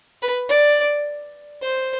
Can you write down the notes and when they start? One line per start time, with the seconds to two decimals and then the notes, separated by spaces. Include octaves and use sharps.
0.22 B4
0.49 D5
1.62 C5